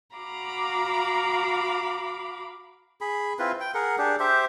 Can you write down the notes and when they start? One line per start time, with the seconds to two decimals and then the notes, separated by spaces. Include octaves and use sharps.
0.15 F#4 F5 A#5 B5 D6
3.01 G#4 B5
3.39 C4 E4 F4 B4
3.60 G5
3.74 G#4 A#4 F#5
3.98 D4 G4 G#4
4.20 G4 C5 E5